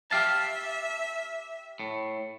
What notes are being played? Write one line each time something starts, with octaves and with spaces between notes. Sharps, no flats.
G4 E5 F5 A5
A2